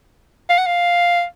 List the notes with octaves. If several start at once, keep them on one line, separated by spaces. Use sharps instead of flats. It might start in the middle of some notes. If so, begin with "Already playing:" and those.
F5
F#5
F5